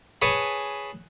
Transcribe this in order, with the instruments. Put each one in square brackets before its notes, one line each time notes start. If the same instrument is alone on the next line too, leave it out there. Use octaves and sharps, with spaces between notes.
[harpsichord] G#4 B4 C#5 G#5 A5